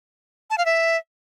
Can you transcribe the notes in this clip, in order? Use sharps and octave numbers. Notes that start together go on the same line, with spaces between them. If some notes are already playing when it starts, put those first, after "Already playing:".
A5
F5
E5